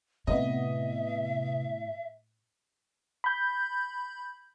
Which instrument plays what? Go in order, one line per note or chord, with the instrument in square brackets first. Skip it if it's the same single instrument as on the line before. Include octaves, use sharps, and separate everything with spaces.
[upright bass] A2 [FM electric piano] C3 B3 [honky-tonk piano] D#5 [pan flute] E5
[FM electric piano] B5 G6